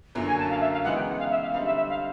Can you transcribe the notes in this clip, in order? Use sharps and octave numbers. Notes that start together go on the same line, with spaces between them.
F#2 D3 F#3 A#3
G#5
A5
F5
E5
F5
C#3 E3 G#3 B3 D#4 F#5
G5
F#5
F5
E5
F5
D3 G3 C4 D#4 F5
E5
E5
F5